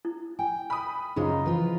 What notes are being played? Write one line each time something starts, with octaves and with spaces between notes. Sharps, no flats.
E4
G5 G#5
B5 D#6
F#2 C#3 D#4 F4 G#4 C5
E3 F3 F4 B4